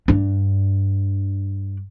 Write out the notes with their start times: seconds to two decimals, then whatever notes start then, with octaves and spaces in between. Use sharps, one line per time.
0.08 G2 D4